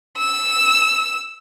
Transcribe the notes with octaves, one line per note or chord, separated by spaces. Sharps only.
E6